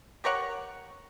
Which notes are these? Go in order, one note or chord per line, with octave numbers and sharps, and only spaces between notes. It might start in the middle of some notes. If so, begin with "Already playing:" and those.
G4 A#4 C#5 F#5